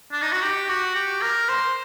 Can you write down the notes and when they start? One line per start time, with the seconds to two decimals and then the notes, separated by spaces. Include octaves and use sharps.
0.12 D4
0.22 D#4
0.32 F#4
0.42 G4
0.69 F#4
0.95 G4
1.22 A#4
1.49 C5